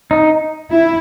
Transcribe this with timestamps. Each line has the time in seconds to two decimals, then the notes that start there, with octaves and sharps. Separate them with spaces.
0.11 D#4
0.70 E4